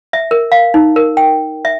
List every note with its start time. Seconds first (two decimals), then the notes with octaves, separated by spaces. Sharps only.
0.13 E5
0.31 A#4
0.52 F5
0.74 D#4
0.96 A#4
1.17 G5
1.65 E5